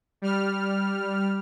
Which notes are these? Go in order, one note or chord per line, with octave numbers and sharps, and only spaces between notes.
G3 F6